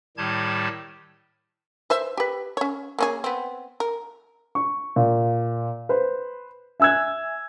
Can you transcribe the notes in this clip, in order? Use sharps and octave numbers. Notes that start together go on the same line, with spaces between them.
A2 D#3 G3 G4 A5 G#6
B4 C5 E5
G4 B4
C#4 C#5
A#3 C#4 G#4
B3 C4
A#4
C#6
A#2
B4 C5
E5 G#5 E6 F#6 G#6